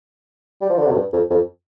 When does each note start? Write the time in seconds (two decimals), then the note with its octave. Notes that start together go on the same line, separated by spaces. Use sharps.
0.61 G3
0.70 F3
0.78 D3
0.87 C3
0.91 F2
0.95 G2
1.13 F2
1.30 F2